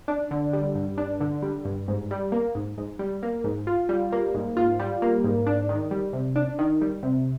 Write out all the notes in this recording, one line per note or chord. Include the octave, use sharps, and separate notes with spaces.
D4
D3
G3
G2
D4
D3
G3
G2
G#2
G3
A#3
G#2
G#2
G3
A#3
G#2
F4
G3
A#3
G#2
F4
G3
A#3
G#2
D4
D#3
G3
C3
D4
D#3
G3
C3